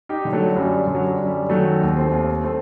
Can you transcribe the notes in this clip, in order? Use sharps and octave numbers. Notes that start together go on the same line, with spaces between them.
D#4 G4
D3
F#3 A3
F#3
F#2 G3
D3
F#3
G3
F#2
G3
D#3 F#3 A3
D#2
A3 C4
D#2
A3 C4